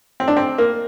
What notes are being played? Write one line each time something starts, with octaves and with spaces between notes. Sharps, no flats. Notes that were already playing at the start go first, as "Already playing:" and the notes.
C4
D4
C4
A#3